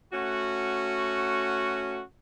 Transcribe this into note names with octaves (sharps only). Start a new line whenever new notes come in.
A3 C#4 F#4